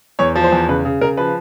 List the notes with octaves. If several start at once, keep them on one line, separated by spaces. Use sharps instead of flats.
E2 C#5
F3
C5
E2
C#3 B4
C#3
C#3 A#4
F3 B4